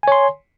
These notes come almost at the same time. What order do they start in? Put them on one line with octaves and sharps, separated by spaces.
G#5 C#5 C6